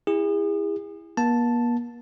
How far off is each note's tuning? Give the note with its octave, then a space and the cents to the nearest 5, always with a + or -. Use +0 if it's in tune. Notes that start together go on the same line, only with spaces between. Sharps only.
E4 +0 G#4 -35
A#3 +45 A5 +0